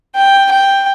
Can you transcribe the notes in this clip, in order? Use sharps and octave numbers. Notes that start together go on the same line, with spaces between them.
G5
G5